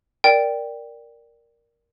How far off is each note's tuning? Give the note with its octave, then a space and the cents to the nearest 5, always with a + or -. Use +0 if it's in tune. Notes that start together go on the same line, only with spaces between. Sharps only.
A#4 +0 D5 +0 G5 +0